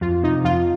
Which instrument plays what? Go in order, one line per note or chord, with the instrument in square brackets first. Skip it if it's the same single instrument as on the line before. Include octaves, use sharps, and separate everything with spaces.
[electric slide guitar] F2 [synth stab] F4
[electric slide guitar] C3 [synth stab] D#4
[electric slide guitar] F2 [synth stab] F4